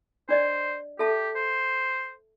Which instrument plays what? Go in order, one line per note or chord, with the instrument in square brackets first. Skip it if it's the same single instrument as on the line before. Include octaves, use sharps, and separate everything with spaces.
[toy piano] D4 D5 D#5 [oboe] C5
[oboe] G4 [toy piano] A4 E5 A5
[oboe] C5